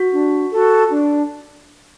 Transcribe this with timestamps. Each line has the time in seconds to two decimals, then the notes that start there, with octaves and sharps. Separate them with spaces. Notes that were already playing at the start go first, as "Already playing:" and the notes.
Already playing: F#4
0.12 D4
0.52 F#4 A4
0.91 D4